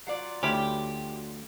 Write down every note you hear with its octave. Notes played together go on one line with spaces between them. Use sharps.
F#3 F4 D5
D2 C#4 E4 G4 B5